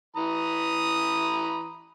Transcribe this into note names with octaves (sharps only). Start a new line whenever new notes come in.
E3 A#5 B5 D#6